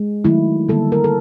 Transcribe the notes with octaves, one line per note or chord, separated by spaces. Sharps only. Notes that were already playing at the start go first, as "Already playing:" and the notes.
Already playing: G#3
D#3 F#3 A3 E4
D3 G3 A#3 A4
A#4
A4